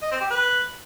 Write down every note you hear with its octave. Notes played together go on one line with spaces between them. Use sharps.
D#5
C4
G4
B4